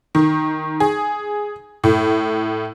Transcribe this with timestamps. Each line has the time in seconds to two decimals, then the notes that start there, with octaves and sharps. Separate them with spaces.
0.15 D#3
0.80 G#4
1.84 A2